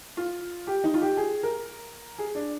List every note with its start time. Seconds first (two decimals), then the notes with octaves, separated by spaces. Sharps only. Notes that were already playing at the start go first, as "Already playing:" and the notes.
0.17 F4
0.67 G4
0.84 D#4
0.94 F4
1.01 G4
1.17 G#4
1.43 A#4
2.19 G#4
2.35 D4